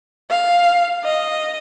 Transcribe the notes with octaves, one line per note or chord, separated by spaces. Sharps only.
F5
D#5